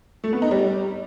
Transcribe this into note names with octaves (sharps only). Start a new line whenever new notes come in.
A3
B3
D#4
G3